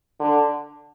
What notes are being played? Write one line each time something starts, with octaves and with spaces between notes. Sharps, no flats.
D3